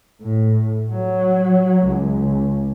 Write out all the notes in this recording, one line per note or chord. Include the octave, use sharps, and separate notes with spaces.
A2
F#3
C#2